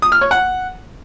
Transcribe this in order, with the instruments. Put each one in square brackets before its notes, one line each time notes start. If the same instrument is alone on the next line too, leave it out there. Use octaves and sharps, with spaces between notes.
[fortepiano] D#6
F6
C#5
F#5